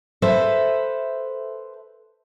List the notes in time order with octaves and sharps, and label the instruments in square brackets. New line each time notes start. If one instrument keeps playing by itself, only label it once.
[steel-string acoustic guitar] A4 B4 C5 E5